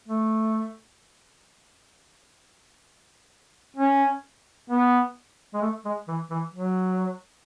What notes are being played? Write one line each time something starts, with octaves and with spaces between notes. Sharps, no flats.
A3
C#4
B3
G#3
A3
G#3
E3
E3
F#3